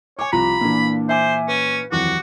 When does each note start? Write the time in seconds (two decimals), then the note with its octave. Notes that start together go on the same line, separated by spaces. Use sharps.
0.19 C#5 G#5 D6
0.33 C2 F3 F4 A#5 B5
0.61 A#2 E3 A#3 D4
1.09 C5 E5 G#5 D6
1.48 C#4 B4
1.92 D#1 F2 E3 F#4 D6